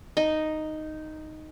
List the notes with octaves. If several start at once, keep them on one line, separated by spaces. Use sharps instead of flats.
D#4